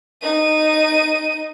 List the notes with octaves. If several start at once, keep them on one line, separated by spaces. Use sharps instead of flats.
D#4 D#7